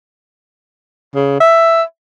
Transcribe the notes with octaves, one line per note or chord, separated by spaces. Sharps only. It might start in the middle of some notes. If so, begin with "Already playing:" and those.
C#3
E5